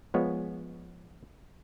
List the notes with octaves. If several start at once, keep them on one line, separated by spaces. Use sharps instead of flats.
F3 G#3 B3 C#5